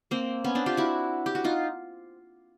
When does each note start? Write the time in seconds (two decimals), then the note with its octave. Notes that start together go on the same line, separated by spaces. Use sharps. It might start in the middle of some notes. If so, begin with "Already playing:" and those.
0.11 A#3 C4
0.44 B3 C#4
0.55 C4 D4
0.66 F4 G4
0.77 E4 F#4
1.26 G4
1.35 F#4
1.44 D#4 F4